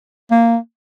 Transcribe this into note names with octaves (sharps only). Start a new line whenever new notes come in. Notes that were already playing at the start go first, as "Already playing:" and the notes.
A#3